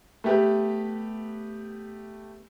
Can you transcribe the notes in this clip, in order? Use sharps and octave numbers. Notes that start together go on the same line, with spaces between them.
A3 B3 G4 B4